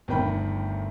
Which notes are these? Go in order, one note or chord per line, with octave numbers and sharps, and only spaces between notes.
G1 D2 D#3 G5 B5